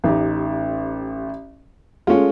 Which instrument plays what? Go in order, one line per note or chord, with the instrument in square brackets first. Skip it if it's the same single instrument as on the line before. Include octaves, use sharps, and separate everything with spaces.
[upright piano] A1 D#4 G4
[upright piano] G#3 A3 [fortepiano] C#4 F4